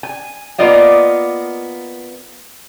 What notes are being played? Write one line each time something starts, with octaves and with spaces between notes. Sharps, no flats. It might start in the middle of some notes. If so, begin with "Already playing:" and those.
G#5
A#3 B3 F4 D5 D#5 F5